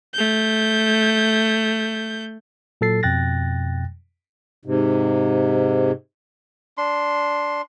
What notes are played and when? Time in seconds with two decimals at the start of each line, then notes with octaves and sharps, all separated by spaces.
0.14 A3 G6
2.81 A#2 F#3 A4 A6 C7
3.03 F2 B2 G5 F#6 A6 A#6
4.65 G#2 C3
6.78 D4 C6